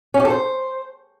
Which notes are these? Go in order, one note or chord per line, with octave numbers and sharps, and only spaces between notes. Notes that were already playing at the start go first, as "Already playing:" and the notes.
C#4
G4
A4
C5